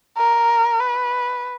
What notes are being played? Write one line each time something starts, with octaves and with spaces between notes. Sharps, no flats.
A#4
B4